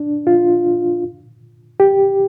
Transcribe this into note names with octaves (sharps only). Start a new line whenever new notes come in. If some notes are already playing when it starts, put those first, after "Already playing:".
Already playing: D4
F4
G4